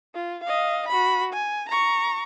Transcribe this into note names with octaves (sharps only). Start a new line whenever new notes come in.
F4
D#5 F5
F#4 B5
G#5
A#5 C#6